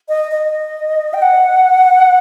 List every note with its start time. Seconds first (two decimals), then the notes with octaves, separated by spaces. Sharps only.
0.09 D#5
0.31 D#5
1.14 G5
1.22 F#5